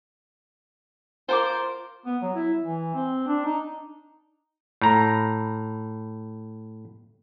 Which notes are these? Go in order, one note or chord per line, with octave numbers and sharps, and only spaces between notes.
F4 A#4 C5 D6
B3
F#3
E4
E3
C4
D4
D#4
A2 A#5